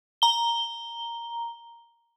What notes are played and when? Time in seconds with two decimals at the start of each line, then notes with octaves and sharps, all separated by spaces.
0.22 A#5 G7